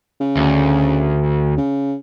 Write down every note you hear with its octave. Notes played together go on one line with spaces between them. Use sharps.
C#3
D2
C#3